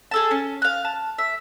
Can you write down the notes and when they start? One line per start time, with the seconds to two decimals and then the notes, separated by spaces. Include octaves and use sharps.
0.11 G#4 A4 A5
0.31 C#4
0.62 F5 F#6
0.85 A5
1.18 E5